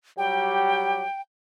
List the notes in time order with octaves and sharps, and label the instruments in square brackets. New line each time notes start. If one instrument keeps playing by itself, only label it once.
[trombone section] F#3 G3 G4 [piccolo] G5